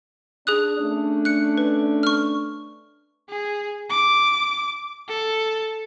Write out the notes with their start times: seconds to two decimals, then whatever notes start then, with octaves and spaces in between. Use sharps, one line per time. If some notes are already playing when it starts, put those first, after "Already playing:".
0.47 D4 G#4 D#6 F#6
0.78 A3 C#4 D4
1.25 F#6 C#7
1.58 B4
2.03 C#6 F6
3.29 G#4
3.90 D6
5.09 A4